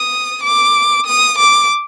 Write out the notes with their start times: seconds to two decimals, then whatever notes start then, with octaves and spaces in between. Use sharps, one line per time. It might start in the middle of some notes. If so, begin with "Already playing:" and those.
Already playing: D#6
0.43 D6
1.06 D#6
1.39 D6